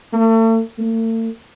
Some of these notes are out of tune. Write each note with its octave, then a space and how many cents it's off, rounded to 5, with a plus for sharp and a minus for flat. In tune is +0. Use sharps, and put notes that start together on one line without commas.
A3 +40
A3 +45